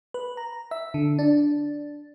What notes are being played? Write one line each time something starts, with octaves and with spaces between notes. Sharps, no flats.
B4
A#5
E5
D3
D4